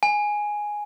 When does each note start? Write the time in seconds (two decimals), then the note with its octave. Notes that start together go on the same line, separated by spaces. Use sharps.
0.03 G#5